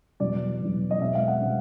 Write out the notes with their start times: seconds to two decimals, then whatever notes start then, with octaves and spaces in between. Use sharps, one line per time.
0.20 E2 B2 F#3 D5
0.60 E2 B2 F#3
0.90 D#5
1.00 B2 G#3 C4 E5
1.15 F5
1.28 F#5
1.41 B2 G#3 C4